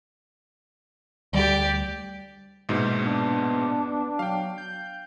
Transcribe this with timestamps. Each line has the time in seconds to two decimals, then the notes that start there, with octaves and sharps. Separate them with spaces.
1.33 D2 G3 G4 D5
2.69 A#1 G#2 B2
3.03 B3 D4
4.19 F#3 F5 G5
4.58 G6